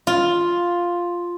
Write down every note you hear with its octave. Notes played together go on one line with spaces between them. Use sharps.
F4